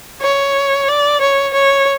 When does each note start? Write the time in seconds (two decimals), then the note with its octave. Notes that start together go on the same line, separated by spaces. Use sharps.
0.22 C#5
0.88 D5
1.21 C#5
1.53 C#5